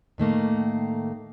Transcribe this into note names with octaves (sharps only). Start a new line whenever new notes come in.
A2 D#3 A3 A#3